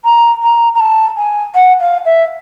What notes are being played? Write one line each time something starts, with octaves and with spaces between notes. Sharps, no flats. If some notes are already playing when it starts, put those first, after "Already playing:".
A#5
A#5
A#5
A5
G#5
F#5
F5
E5